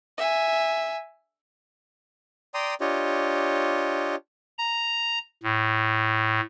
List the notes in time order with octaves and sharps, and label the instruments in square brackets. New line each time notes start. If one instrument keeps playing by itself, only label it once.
[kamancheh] E5 G#5
[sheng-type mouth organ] D5 G5 A#5 C6 D#6
D4 F4 G4 C#5 D#5
[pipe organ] A#5
A2